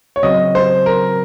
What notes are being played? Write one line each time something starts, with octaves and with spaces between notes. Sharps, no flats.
C#5
C#3 F#3 C4 F#4 D#5
C5
A#4